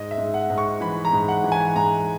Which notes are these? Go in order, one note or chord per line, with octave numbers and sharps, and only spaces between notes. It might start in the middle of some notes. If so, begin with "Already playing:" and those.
Already playing: G#2 D#5
E5
G#2
F#5
G#2
C#6
E3 B5
A#5
G#2
F#5
E3
G#5
G#2 A#5